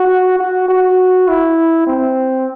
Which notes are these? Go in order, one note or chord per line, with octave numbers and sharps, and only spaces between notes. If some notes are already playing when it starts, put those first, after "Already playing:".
Already playing: F#4
F#4
F#4
E4
C4